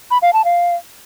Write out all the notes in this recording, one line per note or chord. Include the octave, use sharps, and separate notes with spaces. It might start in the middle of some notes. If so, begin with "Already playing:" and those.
B5
F5
A5
F5